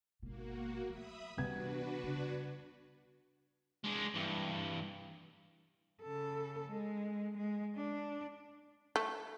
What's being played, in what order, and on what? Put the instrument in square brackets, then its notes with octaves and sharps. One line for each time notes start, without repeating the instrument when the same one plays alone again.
[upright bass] G#1 B2 [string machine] A#3 F#4
[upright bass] F#3 A3 [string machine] E5 B5 D#6
[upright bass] C3 E3 [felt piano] G3 B3 G#6 [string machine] D4 F#4 B4
[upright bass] C#3
[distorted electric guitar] G#3 D4
G2 E3
[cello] C#3 A4
G#3
G#3
D4
[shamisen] A3